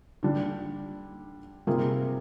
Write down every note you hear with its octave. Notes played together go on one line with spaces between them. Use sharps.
D3 G3 D4
C3 G3 A#3 F4 G#4